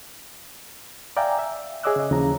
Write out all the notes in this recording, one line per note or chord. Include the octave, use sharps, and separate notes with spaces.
D5 E5 F5 G5 G#5 A#5
E5
G#4 C#5 D#5 D6 E6 F#6
C#3 D#5
D#2 C#3 E3 F3 A#5